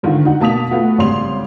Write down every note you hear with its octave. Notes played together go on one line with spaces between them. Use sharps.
G#2 D3 D#3 F4
D#4 F#4 F#5
B2 A#3 A5 D#6 B6 F7
A3 B3 F4 F#4
G#1 C#3 G3 C6 F7